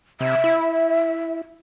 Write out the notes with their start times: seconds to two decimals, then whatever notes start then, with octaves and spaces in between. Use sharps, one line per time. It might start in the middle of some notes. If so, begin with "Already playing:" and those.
0.21 C3 E5
0.44 E4